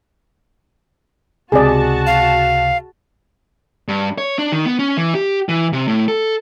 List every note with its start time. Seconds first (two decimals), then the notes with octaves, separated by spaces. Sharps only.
1.52 C#2 C3 F#4 G#4 D5 A5
2.07 F5
3.88 G2
4.18 C#5
4.38 D4
4.52 D#3
4.65 B3
4.79 C#4
4.97 E3
5.15 G4
5.49 E3
5.73 C3
5.88 A2
6.08 A4